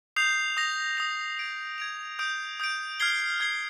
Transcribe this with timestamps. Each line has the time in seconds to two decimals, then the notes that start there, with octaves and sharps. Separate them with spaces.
0.16 D#6 G6 C7 F7
0.57 D#6 A#6 F7
0.97 D#6 A#6 F7
1.38 G#6 D7 F7
1.78 G#6 D7 F7
2.19 D#6 G6 D7
2.60 D#6 G6 D7
3.00 F6 G#6 C7 G7
3.40 F6 G#6 C7 G7